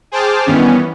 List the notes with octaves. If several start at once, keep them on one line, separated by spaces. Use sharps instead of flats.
G#4 C5 G5 A5 D6 F6
G2 D#3 E3 B3 C#4